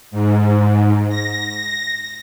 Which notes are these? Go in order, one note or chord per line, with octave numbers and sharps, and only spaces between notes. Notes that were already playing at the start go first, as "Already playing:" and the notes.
G#2
A#6